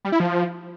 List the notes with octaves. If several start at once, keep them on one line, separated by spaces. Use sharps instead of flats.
G3
E4
F3